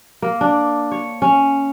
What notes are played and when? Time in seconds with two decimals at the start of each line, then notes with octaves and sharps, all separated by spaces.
0.22 A#3
0.41 D4
0.91 C#5
1.22 C#4